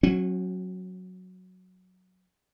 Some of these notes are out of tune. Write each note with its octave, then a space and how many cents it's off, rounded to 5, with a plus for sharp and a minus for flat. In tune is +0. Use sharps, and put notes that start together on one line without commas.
F#3 -5 C#4 -40